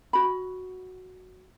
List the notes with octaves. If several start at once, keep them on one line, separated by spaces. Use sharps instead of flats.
F#4 B5